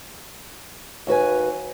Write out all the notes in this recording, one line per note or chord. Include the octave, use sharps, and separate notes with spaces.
D#2 F#4 B4 G#5